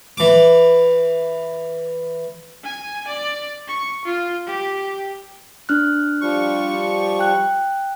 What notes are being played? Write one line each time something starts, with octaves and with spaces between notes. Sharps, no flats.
E3 D6
G#5
D5
C#6
F4
G4
D4 F6 F#6
F3 G3 C#6
G5 F#6